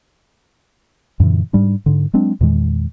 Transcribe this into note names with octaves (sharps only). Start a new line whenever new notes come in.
F#2 A#2 D3 E3
G#2 G3 D4
G#2 D3
F#3 G#3 C4 D4
E2 A#2 D#3 G#3